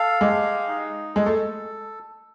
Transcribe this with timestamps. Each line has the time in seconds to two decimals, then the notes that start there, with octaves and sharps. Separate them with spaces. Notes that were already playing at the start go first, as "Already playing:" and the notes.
Already playing: A4 F5
0.21 G#3 G4
0.68 D#4
1.15 G#3 A4
1.26 A3